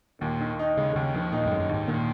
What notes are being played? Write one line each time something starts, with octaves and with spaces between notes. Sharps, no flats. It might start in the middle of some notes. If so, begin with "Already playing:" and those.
D#2 A#2
D#3
D#4
C#3 G#3
D#2 C#3
D#3 F3
A#2 D#4
F#2
G#3
F#2
D#2 G#2
A#2 D#3